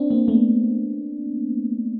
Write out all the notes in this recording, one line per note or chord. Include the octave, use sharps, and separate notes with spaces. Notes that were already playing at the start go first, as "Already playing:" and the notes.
Already playing: C4 D4
A#3 C4
A3 B3